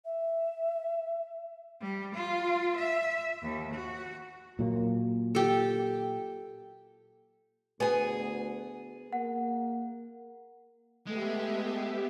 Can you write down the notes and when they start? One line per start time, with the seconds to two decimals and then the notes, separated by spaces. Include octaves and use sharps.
0.04 E5
1.81 G3
2.15 F4
2.77 E5
3.42 D#2
3.74 F#4
4.59 A#2 F#3 A#3
5.35 G4 A4
7.80 D2 B3 G#4 G#5
9.13 A#3 F#5
11.07 G#3 A3 B3 G4 E5